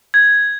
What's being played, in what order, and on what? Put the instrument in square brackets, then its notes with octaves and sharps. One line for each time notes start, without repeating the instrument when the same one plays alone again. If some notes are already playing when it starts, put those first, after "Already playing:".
[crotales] G#6